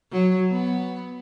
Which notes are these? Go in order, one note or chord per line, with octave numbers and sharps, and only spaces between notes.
F#3
B3